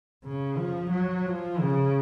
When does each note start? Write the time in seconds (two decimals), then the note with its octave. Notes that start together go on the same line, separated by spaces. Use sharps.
0.24 C#3
0.58 F3
0.91 F#3
1.26 F3
1.61 C#3